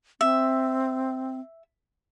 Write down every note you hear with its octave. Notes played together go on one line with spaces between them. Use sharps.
C4 E5